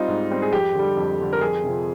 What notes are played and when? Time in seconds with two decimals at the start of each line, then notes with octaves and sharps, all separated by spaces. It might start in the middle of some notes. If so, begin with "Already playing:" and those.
Already playing: G3 C4 D#4 F4
0.08 G#2
0.31 G3 C4
0.42 G#4
0.53 F2 G4
0.75 D3 G3
0.97 F2
1.20 D3 G3
1.33 A#4
1.41 F2 G#4
1.63 C3 F3 C4